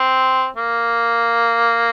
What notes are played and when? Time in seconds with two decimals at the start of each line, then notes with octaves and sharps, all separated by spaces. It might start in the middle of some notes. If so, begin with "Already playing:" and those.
Already playing: C4
0.56 A#3